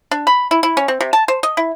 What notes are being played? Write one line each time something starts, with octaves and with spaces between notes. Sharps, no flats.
D4
B5
E4
E4
C#4
C4
C3
A5
C5
D#5
E4